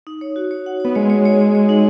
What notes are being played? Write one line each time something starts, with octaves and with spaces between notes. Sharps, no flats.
D#4
C#5
F#4
C#5
F#5
B3 C#5
G#3 C#5
C#5
C#5
C#5
C#5
D#4